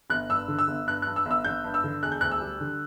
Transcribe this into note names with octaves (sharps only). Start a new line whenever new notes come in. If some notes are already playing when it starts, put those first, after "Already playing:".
G1 F#6
G2 E6
D3
E6
G1
G2 F#6
F#6
G2
E6
G1
E6
G1 G6
G2
E6
D3
E1 F#6
G6
D2 F#6
E6
G3
D3